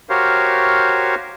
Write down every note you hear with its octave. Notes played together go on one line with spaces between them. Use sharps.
F#4 G4 A#4 C5 C#5 F5